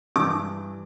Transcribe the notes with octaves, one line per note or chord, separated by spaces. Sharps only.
G2 E3 D6